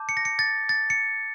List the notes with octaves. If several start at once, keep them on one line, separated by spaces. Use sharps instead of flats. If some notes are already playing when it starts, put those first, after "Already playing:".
Already playing: A5 D6 G6
C#7
A#6
C#7
A6
A6
C#7